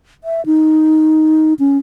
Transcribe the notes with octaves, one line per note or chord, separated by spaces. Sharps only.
E5
D#4
C#4